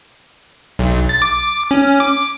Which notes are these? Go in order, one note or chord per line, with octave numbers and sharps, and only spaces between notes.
B1
A6
D6
C#4
D6